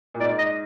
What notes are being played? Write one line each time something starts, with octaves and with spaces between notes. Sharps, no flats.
A#2
G#2 D5
D#5